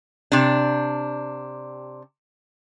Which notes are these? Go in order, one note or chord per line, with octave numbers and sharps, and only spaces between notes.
C3 D4